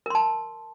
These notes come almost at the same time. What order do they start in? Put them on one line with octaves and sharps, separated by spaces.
A#4 C6 A5